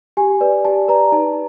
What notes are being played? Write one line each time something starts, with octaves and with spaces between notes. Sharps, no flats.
G4 G#5
B4 D5
G4 A5
B4 D5 A#5
D#4 A5